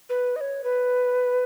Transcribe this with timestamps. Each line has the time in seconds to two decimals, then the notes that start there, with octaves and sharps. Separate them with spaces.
0.10 B4
0.36 D#5
0.41 C#5
0.64 B4